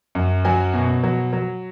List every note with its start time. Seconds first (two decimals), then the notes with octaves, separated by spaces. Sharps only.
0.15 F#2
0.45 F#3 G#5
0.74 B2
1.03 F#3
1.33 F#3